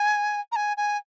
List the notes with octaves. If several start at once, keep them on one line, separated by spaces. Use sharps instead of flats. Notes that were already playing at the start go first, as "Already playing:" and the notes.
Already playing: G#5
A#5
G#5
G#5